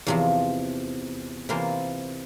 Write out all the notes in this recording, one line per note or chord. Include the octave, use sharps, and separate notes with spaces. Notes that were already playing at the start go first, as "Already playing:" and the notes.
E2 C3 F3
C3 E3 A#3 F4 C5